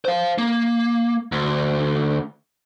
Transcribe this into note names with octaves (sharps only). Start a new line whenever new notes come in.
C5 F5
A#3
D2